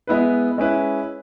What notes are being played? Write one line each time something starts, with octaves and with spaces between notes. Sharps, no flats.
G#3 B3 E4 B4
G#3 C#4 E4 B4